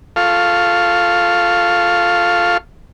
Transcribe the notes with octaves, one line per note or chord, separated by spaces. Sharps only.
F4 A4 F5 C#6